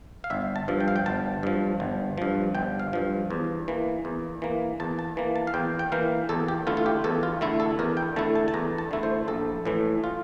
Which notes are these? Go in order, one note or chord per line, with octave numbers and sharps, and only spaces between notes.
F5
G1 E5
A5
G2 F3
G5
F5
G5
G1 A5
G2 F3
G1
G2 F3
G1 G5
F5
G2 F3
E2
E3 A#3
E2
E3 A#3
E2 A5
A5
E3 A#3
A5
F5
E2 G5
G5
E3 A#3 F5
E2 A4
G4
D3 A3 E4 F4
F4
G4
E2 A4
F4
D3 A3 E4
A4
E2 A#4
G5
D3 A3 E4 A5
A5
A5
E2 A#5
A5
D3 A3 E4
C5
A#1 A4
A2 E3 A3
F4